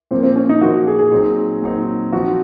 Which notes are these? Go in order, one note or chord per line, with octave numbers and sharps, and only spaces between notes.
A#2 F3 A#3 C4
C4
C#4
D#4
A#2 F3 A#3 F#4
G#4
G#4
A#2 F#3 C4 D#4
A#2 F#3 C4 D#4
F3 C4 D#4 F#4